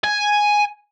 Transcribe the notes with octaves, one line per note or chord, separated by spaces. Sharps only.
G#5